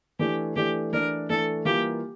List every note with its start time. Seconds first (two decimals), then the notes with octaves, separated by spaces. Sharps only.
0.19 E3 A3 D4 G4
0.56 E3 A3 D4 G4
0.93 E3 A3 D4 A#4
1.30 E3 A3 D4 A4
1.65 E3 G3 A#3 F4 G4